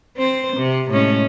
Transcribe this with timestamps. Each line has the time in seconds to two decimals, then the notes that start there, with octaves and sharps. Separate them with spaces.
0.17 C4 C5
0.57 C3
0.91 A2 G#3 C#4